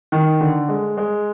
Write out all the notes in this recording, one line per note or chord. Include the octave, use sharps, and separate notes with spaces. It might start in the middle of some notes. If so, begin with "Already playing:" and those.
D#3
D3
G#3
G#3